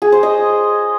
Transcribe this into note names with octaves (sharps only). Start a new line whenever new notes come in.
G#4
C5
D#5